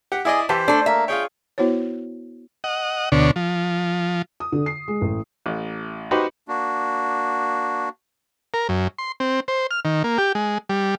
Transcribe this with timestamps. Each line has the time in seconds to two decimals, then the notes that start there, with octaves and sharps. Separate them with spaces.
0.12 G4 F#5
0.25 E4 G#4 D5 D#5
0.49 E3 G4 B4 C5 A5
0.68 A3 D4 A4
0.86 A#3 E5
1.08 F4 G#4 C#5 G5
1.58 B3 E4 F#4 C5 C#5
2.64 D#5 F#5
3.12 D2 B2 D3 D4 C#5
3.36 F3
4.40 D#6
4.52 D3
4.66 C7
4.88 G#3
5.01 A1
5.46 A1
6.11 D#4 F#4 G4 B4 C5
6.48 A#3 D4 F#4
8.54 A#4
8.69 F#2
8.99 C6
9.20 C4
9.48 C5
9.71 F6
9.85 D#3
10.04 A#3
10.18 G4
10.35 G#3
10.69 G3